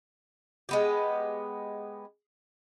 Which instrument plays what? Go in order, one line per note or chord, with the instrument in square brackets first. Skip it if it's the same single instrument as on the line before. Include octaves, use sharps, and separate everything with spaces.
[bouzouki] G#3 B3 G4